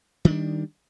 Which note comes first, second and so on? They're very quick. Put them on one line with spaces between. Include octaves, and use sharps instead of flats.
D#3 D4 G3